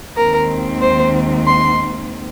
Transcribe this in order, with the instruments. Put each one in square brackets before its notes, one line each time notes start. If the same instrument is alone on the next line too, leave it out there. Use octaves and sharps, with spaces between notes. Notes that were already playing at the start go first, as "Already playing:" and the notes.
[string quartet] D#2 D#3 G#3 C4 A#4
C5
C6